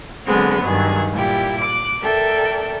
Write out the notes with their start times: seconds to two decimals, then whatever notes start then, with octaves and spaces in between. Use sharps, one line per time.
0.25 D3 F#3 G#3 B3 C4
0.62 G2 D#3 F#3 G#4
1.12 A#2 G3 E4 G4
1.60 D6 F#6
2.01 A4 A#4 D5 E5 G5